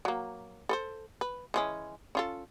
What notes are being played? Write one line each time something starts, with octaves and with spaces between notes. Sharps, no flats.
F#3 A#3
A4 B4 C5
B4
E3 G#3 C#4
C#4 F4 A4